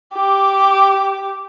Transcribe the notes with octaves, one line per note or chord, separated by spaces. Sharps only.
G4 D6